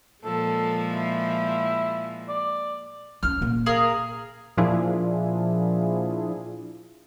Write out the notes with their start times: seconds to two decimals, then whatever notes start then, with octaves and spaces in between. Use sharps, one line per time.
0.24 A#2 F3 G#3 A4
0.93 E4
2.28 D5
3.23 F3 C#4 F6
3.41 A#2 A#3
3.66 G#4 A#4 F5
4.57 A#2 F3 D4 E4 F4 G#4